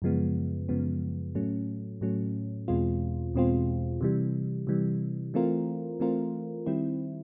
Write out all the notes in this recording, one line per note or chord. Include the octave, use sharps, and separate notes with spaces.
F#2 C#3 F3 G#3 B3
F#2 C#3 F3 G#3 B3
A2 F#3 A3 C#4
A2 F#3 A3 C#4
E2 B2 G#3 C4 F4
E2 B2 G#3 C4 F4
C3 E3 G3
C3 E3 G3
E3 A3 C4 F4 A#4
E3 A3 C4 F4 A#4
D#3 G3 C4 E4